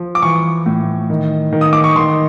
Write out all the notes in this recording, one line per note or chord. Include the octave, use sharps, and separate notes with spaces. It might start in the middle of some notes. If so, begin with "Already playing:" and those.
Already playing: F3
D6
E3 C#6
A2
D#3
D#3
D#6
D6
C#6
D#3 C6